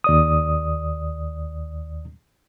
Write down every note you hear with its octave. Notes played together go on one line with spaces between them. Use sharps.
D#2 D5 D#6